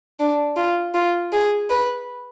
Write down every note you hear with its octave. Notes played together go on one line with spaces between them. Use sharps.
D4
F4
F4
G#4
B4